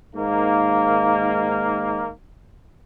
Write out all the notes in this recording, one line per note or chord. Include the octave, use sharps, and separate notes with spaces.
G#2 D#3 A#3